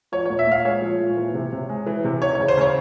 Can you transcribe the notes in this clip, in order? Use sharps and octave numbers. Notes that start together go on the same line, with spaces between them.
F3 C#5
A#2 C#5
E5
A#2 F5
G#3 C#5
F3
A#2
E3
C3
C3
G#3
E3
C3
E3 C#5
C#3 C#5
C5
C#3 C#5